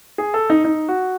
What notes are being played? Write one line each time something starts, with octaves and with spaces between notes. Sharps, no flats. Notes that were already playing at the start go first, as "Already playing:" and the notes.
G#4
A4
D#4
D#4
F#4